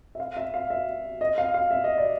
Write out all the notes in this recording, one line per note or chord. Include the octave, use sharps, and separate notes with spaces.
E5
F5
E5
F5
E5
D#5
F5
F5
E5
D#5
D5